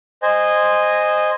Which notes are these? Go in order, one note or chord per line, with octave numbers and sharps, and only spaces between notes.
C5 D#5 G#5